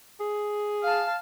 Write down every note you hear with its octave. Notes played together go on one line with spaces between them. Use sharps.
G#4
F5 A5